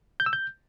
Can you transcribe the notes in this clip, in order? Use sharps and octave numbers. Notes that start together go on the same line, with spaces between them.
G6
E6
G6